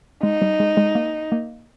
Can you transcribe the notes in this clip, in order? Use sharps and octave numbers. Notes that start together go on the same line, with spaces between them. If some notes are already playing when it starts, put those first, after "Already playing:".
G#3 D#4
G3
G#3
G#3
A#3
A#3